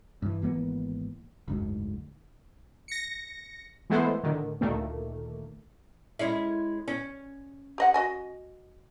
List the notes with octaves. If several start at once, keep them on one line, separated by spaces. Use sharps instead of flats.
G2 E3
G#1 E3 A#3 B3
F#1 D2 G#2
A#6 C#7
E3 G#3 A3 B3 E4 C5
A2 D3 D#3
D2 A#2 D#3 A3 A#3
G#3 C#4 E4
C#4
G4 D#5 F#5
F#4 D#5 G#5